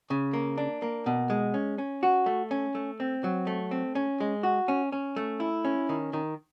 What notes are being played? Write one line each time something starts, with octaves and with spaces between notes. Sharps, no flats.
C#3
A#3
D4
A#3
B2
G#3
C#4
C#4
F#4
A3
C#4
A3
C4
F#3
A3
C4
C#4
G#3
F#4
C#4
C#4
A3
E4
C#4
D#3
D#3